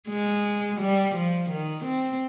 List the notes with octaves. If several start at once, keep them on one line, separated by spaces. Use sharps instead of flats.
G#3
G3
F3
D#3
C4